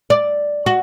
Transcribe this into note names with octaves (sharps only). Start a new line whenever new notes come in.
D5
F#4